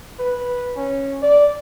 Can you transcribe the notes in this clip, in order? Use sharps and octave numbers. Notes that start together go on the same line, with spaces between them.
B4
C#4
D5